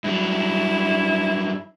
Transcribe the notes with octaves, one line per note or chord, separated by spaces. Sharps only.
G2 F#3 E4